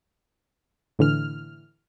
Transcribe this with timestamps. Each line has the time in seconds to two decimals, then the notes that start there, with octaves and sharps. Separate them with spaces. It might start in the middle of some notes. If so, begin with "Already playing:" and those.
0.99 A2 D3 E3 F6